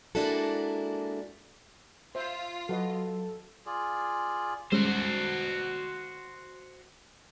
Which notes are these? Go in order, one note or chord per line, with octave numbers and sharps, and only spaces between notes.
G#3 A#3 D4 E4 F#4 A4
F4 C5 E5
F#3 F#4 A4 B4 D#5
F4 G#4 D5
G3 G#3 C#4 F#4 C5